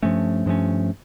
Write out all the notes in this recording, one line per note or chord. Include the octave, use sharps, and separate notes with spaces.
G2 F3 A3 C#4
G2 F3 A3 C#4